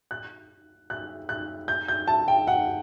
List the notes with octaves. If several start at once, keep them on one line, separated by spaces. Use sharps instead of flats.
F#6
F#6
F#6
G6
G6
A5
G5
F#5